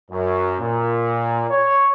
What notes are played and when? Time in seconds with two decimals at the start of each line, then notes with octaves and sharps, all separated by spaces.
0.11 F#2
0.59 A#2
1.50 C#5